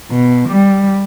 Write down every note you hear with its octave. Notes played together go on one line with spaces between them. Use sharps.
B2
G3